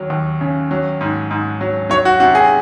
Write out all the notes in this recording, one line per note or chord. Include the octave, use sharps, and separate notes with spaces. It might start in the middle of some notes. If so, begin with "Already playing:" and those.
Already playing: D#2 F#3
D#2
C#3
F#3
G#2
G#2
F#3
F#3 C#5
F#4
C3 F#4
G#4